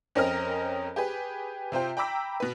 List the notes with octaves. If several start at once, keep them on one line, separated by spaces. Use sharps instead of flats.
F2 C4 C#4 A#4 D#5 F6
G4 G#4 B4
C3 F4 C5 G5
G5 A#5 B5 D6 E6 B6
B2 B4